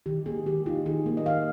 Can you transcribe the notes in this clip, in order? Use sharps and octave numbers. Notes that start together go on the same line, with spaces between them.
D#3 G4
A#3 G#4
D#3 G4
D#4 F4
D#3 G#4
A#3
D#5
D#3 F5